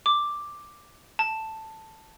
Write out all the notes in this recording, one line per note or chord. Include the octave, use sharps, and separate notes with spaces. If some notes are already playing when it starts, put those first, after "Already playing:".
D6
A5